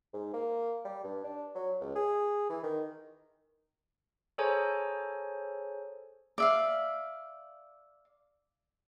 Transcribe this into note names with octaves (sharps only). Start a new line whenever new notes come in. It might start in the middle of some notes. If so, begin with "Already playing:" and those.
G#2
A#3
G3
G2
D4
F#3
C#2
G#4
E3
D#3
G#4 A4 C5 C#5 G#5 A#5
D5 E5 F5